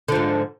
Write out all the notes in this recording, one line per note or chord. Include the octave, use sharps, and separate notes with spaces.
G#2 D3 F3